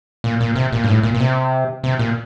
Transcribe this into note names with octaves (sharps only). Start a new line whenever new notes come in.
A#2
A#2
C3
A#2
G2
A2
A#2
A#2
C3
C3
A#2